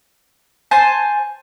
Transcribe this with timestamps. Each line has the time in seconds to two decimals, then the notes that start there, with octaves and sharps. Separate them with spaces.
0.71 C5 G#5 A5